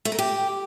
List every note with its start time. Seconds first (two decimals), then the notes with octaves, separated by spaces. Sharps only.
0.05 A3
0.12 A#4
0.19 G4